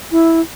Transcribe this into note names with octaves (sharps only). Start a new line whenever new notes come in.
E4